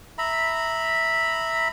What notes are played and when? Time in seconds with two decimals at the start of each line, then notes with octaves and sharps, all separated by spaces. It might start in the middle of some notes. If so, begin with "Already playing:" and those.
0.18 E5 A#5 B5